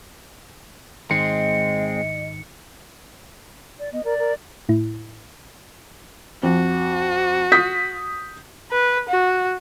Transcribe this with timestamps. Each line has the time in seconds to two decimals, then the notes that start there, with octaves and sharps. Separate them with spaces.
1.11 G#1 G#2 D#3 G#3 C4 D#5 C#7
3.79 D5
3.92 B3 D#5
4.04 A#4 D5
4.18 A#4
4.69 A2 E4
6.43 F2 F#4
7.52 D#6 G6 B6
8.71 B4
9.09 F#4